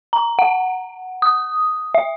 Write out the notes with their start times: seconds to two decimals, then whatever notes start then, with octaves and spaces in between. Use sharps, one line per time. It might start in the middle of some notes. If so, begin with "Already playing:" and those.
0.13 A#5
0.39 F#5
1.22 D#6
1.95 E5